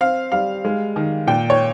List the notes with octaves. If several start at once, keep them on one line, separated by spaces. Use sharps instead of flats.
C4 F5
G3 F5
G#3
D#3
A#2 G5
C#5